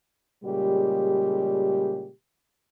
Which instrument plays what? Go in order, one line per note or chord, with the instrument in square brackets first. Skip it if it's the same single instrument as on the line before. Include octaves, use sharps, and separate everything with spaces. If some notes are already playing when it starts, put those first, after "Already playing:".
[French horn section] A#2 C#3 G3 G#3 G4